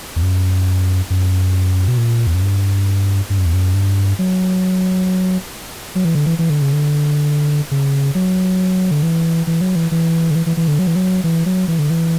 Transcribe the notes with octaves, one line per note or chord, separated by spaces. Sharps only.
E2
F#2
F#2
B2
A#2
E2
F#2
G2
G2
F#2
E2
F#2
G2
F#3
F#3
E3
D3
E3
E3
D3
C#3
D3
C#3
F#3
D3
E3
E3
F#3
E3
E3
D3
E3
E3
E3
D3
F#3
E3
F#3
E3
F#3
E3
D3
E3